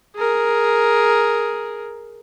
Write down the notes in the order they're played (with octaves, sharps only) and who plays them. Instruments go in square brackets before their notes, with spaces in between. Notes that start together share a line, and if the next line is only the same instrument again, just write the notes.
[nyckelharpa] G#4 A#4